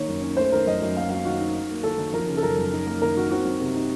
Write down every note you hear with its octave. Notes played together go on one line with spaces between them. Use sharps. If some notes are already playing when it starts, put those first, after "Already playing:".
Already playing: D#3 A#3 C#5
F#2
C#4
A3 C5
D#3 A#4
F#2 D#5
F#2
A#3 F5
F#3 F5
D#3 F#4
D#4
D#4
A#3
D#3 A4
D#3
F3 A#4
C#3
A4
F#2 A#4
F#2
D#4
A#3
D#3 A#4
D#3 F#4
C4 F#4
F#3
C3
D#4